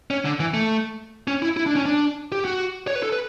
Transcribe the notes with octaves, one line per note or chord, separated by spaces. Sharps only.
C#4
D3
E3
A3
C#4
E4
E4
D4
C#4
D4
G4
F#4
C#5
B4
A4
B4